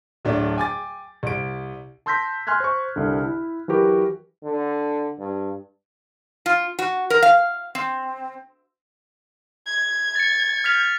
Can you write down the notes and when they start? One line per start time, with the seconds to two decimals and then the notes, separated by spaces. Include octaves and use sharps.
0.25 D1 F#3 A3 D4
0.56 G5 G#5 D6 A6
1.23 C2 D7
2.06 A5 C6 E6 G6 A#6 B6
2.47 G#5 C6 F6 F#6 G#6
2.60 C5 C#6
2.96 C2 D3
3.25 E4
3.68 E3 F#3 F#4 G4 A#4 B4
4.43 D3
5.19 G2
6.46 F4
6.79 F#4
7.10 A#4
7.22 F5
7.75 C4
9.67 G#6
10.15 A6 C#7
10.64 F6 B6 F7